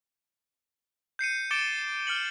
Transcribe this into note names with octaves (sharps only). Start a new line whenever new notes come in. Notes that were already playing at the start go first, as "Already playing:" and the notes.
G6 C7 C#7 D#7
D6 A6 C#7 D7 E7 G7
F6 C#7 F#7